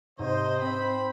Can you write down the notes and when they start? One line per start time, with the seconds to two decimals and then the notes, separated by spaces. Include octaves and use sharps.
0.19 G#2 C3 C5 D#5
0.62 C4 B5